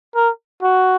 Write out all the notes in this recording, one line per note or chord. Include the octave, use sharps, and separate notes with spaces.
A#4
F#4